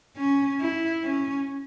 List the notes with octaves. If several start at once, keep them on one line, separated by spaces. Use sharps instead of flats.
C#4
E4
C#4